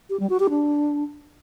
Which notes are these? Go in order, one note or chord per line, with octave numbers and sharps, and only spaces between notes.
G4
G3
F#4
G4
D4